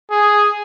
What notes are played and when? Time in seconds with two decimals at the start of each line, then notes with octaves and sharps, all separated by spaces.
0.11 G#4